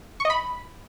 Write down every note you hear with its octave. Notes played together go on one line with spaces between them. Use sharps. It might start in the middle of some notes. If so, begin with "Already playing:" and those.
C#6
D#5
B5